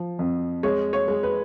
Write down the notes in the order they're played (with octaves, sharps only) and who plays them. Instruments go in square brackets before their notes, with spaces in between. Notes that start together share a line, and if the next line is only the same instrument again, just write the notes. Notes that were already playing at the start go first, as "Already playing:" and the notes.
Already playing: [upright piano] F3
F2
G#3 C#5
C#5
G#3
B4